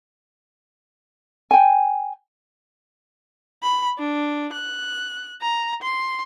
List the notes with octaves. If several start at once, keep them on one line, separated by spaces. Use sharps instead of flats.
G5 G#5
B5
D4
F#6
A#5
C6